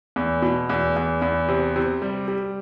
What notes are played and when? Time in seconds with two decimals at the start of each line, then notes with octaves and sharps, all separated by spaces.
0.16 E2
0.42 B2
0.70 E2
0.96 E2
1.22 E2
1.48 C3
1.76 C3
2.02 G3
2.28 G3